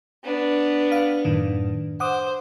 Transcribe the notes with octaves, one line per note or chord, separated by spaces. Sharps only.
B3 D4
F5
F#2 A2 D#3
C5 F#5 D6 D#6